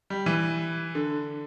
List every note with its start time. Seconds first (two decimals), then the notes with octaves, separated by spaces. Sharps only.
0.10 G3
0.26 E3
0.95 D3